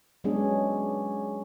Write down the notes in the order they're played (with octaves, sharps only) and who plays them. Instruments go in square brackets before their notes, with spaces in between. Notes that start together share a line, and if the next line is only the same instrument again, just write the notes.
[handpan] F#3 G#3 B3 C#4 D4 G#4